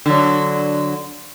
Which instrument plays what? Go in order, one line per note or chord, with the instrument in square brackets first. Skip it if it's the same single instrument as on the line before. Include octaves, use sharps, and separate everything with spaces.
[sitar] D3 F#3